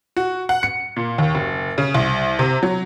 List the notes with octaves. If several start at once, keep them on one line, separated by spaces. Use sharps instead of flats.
F#4
F#5
C#7
A#2
D#2
F#1
C#3
C2
C3
F#3